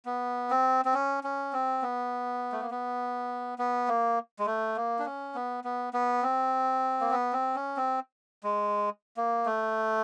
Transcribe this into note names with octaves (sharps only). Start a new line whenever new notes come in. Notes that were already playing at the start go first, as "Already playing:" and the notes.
B3
C4
C4
C#4
C#4
C4
B3
A3
A#3
B3
B3
A#3
G#3
A3
A#3
D4
C#4
B3
B3
B3
C4
A#3
B3
C4
C#4
C4
G#3
A#3
A3